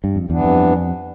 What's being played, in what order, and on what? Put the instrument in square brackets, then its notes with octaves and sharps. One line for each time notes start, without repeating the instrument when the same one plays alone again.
[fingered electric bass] G2
F2
[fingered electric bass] E2 [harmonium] G2 E3 B3 D4
[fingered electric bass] F2